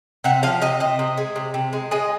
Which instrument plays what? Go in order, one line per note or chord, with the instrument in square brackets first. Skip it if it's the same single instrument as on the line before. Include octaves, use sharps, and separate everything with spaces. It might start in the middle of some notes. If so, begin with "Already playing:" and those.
[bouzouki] C3 F#5
F3 F5
C3 D#5
C3 D#5
C3
G#3
C3
C3
G#3
G#3 D#5